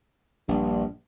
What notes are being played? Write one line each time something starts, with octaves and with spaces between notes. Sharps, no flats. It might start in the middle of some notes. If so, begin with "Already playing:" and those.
A#1 G2